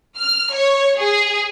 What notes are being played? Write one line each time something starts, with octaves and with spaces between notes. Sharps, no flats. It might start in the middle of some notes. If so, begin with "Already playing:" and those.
F6
C#5
G#4